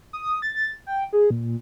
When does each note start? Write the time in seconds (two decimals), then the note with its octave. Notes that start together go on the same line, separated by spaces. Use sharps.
0.13 D#6
0.42 A6
0.87 G5
1.13 G#4
1.30 A#2